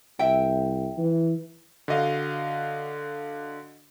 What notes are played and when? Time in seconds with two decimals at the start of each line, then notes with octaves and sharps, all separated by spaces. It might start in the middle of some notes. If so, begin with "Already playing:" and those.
0.19 C2 E5 G5
0.98 E3
1.88 D3 F#4 D#5 F5